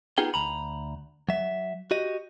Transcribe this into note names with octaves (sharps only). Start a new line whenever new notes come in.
B3 D#4 F4 G#4 G5
D2 A#5 B5
F#3 E5
F#4 G4 D#5